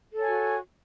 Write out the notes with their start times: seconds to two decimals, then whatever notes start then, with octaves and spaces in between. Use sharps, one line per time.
0.12 A4
0.17 C#5
0.21 G#5
0.26 F#4